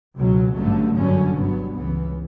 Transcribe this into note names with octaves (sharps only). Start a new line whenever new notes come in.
C#2 B2 F#3
A1 G2 D3 F#3 A3
G1 F#2 D3 F#3 C#4
G1 G2 F#3 B3
C#2 C#3 E3 B3